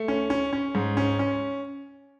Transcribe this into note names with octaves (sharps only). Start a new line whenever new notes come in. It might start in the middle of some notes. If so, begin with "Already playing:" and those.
Already playing: A3
C#4
C#4
C#4
G#2
C#4
C#4